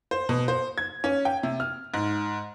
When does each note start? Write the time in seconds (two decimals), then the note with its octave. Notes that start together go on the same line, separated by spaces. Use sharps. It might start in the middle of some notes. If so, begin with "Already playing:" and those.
0.11 C5
0.29 B2
0.48 C5
0.78 G#6
1.04 C#4
1.25 G5
1.43 C3
1.60 F6
1.94 G#2